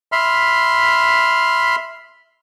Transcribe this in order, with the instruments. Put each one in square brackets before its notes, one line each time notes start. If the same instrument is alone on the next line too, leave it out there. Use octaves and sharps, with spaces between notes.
[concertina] E5 B5 C6 F6